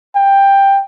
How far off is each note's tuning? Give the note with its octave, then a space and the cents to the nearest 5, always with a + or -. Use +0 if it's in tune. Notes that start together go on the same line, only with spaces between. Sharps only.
G5 +10